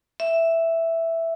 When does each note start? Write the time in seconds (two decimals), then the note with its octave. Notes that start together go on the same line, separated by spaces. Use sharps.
0.20 E5